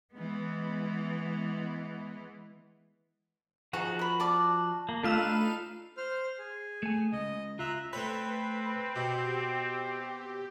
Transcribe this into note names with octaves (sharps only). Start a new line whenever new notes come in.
E3 G#3 B3
F3 D#4 F#4 G#4 F#5
A#4 B5
D5 A5 D6
A#3
A3 D4 D#4 F4 B4 E6
C5 F6
G#4
A3 G#5
C#2 D#5
F4 E5 A#5 F#6
A3 C4 B4 C#5
B2 G4